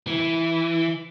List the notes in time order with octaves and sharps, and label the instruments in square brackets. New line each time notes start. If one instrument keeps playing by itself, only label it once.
[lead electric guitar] E3